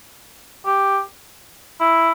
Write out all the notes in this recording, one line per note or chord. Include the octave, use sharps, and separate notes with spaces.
G4
E4